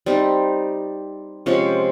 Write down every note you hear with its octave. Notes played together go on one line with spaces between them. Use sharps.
G3 C4 D#4
C3 F3 G#3 C#4